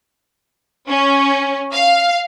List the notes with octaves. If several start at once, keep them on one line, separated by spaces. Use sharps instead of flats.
C#4
F5